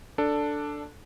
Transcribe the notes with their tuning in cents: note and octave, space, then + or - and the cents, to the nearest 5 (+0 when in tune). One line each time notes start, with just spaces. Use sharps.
D4 +0 A4 +5